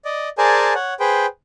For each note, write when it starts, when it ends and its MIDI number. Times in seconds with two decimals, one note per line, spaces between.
0.05 0.29 74
0.05 0.29 75
0.38 0.74 68
0.38 0.74 70
0.38 0.74 72
0.38 0.74 74
0.38 0.74 80
0.38 0.74 81
0.75 0.94 73
0.75 0.94 78
1.00 1.26 68
1.00 1.26 71
1.00 1.26 72
1.00 1.26 79